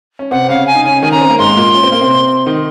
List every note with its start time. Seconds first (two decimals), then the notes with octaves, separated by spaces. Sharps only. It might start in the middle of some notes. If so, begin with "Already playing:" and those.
0.19 C#4
0.31 C3 C4 F#5
0.49 C#3 C#4 F5
0.67 G#5
0.75 D#4
0.85 C#3 C#4 G#5
1.02 D#3 D#4 G#5
1.11 C#4 A#5
1.21 C4
1.30 A#3
1.39 G#2 G#3 C6
1.57 A#2 A#3
1.75 C#4
1.84 C4
1.92 A#3
2.01 C3 C4
2.46 D#3 D#4